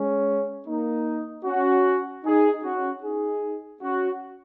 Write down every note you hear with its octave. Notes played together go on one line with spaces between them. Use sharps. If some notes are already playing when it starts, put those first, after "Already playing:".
Already playing: G#3 C#4
A#3 D#4
C#4 F#4
D#4 G#4
C#4 F#4
D#4 G#4
C#4 F#4